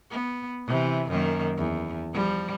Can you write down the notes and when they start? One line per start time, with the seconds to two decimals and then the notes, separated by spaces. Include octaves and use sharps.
0.11 B3
0.67 C3 E3
1.09 F#2 D#3 A#3
1.58 E2
2.13 F3 G3